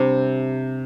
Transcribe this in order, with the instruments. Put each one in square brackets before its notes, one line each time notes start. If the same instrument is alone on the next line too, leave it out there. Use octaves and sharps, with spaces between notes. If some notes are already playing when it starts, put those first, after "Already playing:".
Already playing: [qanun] C3 G3 D4